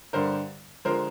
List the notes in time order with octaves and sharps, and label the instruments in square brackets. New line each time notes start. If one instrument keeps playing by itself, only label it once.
[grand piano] G2 D3 G3 A#4 C5
D3 F3 G#3 A#4 C5